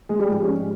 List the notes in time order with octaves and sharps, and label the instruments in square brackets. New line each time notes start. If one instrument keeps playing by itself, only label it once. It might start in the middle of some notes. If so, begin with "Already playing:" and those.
[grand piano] G#3 G#4
G3 G4
G#2 F3 G#3
C#4